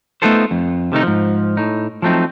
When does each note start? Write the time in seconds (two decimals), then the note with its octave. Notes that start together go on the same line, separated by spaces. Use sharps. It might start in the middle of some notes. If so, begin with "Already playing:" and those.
0.22 A3 B3 D#4 F4 A4 C5
0.51 F2
0.92 C3 D#3 A3 D#4
1.03 G#2 F3
1.57 A2 D#4
2.02 F3 F#3 A3 C4 D#4